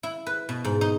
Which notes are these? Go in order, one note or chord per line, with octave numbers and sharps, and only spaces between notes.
E4
B4
B2
G#2
D#4